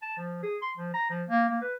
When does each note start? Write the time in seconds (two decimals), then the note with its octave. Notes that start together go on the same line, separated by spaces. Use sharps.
0.02 A5
0.17 F3
0.43 G#4
0.62 C6
0.77 F3
0.94 A#5
1.10 F3
1.29 A#3
1.49 A#3
1.61 B4